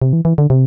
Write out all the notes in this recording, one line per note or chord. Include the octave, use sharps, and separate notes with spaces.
C3
E3
E3
D3
C3